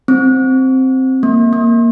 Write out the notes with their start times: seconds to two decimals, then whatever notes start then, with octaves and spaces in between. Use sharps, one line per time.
0.08 C4
1.23 A#3
1.53 A#3